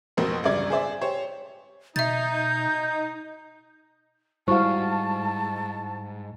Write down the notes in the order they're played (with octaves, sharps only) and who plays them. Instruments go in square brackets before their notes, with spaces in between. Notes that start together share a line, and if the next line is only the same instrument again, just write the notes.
[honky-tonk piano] A1 F2 B2 C4 A#4
G1 C#2 G2 D5 G#6
G#4 C5 D5 E5
G4 C5 C#5
[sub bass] B2 [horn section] D#4 [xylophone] E5 A6 [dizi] G6
[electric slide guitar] G#2 [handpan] G3 F#4 F5 [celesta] E4 C5 C#6 [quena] A5